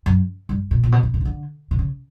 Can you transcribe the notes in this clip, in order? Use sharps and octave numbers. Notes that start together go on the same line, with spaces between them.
F#2
G2
A#2
A#2
B2
C3
C3
C#3
D3
C3
C#3